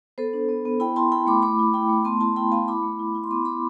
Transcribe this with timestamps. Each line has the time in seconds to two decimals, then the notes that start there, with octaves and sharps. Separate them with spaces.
0.18 B3 A4 C5
0.33 D4
0.49 B3
0.65 B3
0.80 E4 G5 B5
0.96 E4 A5 C6
1.12 E4 G5 B5
1.27 A3 B5 D6
1.42 A3 B5 D6
1.59 E4
1.74 E4 G5 B5
1.89 A3
2.05 B3 A5 C6
2.20 E4 A5 C6
2.36 E4 G5 B5
2.52 B3 F5 A5
2.68 E4 B5 D6
2.83 A3
2.99 E4
3.15 E4
3.24 C6
3.31 B3 B5 D6
3.45 B3 B5 D6